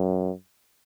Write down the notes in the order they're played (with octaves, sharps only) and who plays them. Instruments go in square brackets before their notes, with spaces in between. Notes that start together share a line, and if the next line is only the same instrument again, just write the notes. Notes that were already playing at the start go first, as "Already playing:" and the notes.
Already playing: [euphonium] F#2